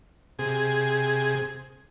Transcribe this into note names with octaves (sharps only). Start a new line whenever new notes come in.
C3 G#4